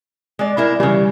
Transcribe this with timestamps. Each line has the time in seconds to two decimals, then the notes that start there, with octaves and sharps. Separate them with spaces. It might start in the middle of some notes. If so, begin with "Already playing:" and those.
0.39 G#3 D5
0.57 G#3 E4 A#4
0.80 C#3 E3 G3